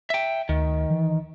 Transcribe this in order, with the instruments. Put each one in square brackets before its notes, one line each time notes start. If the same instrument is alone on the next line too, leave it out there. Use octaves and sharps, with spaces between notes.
[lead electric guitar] E5 G5
[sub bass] D2 [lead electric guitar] D#3
[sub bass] E3